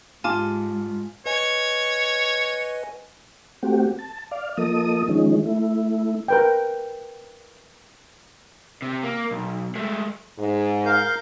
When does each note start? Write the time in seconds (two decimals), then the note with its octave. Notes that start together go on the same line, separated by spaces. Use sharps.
0.24 G#2 F4 G#5 A5 D6
1.26 B4 C#5 D#5 G#5
3.63 A3 C4 F#4 G4
3.99 A5
4.31 D5 F5
4.57 F3 A#3 A4 D#5 D#6
5.09 D#3 F3 G#3 C#4 D#4
5.46 A3 E4
6.28 A#4 B4 G5
8.82 C3
9.03 A#3
9.31 B1
9.75 G#3 A3
10.38 G#2
10.85 A#4 F5 G6